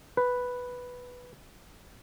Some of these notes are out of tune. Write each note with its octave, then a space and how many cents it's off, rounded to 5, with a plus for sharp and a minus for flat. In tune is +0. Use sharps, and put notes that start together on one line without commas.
B4 +0